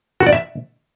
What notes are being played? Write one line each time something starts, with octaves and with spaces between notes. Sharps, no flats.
F#4
D5
E5